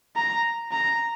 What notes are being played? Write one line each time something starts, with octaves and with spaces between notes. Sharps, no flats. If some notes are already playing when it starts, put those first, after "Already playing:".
A#5
A#5